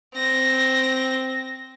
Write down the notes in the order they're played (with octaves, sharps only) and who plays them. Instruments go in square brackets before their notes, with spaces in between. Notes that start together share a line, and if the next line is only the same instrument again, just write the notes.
[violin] C4 A#6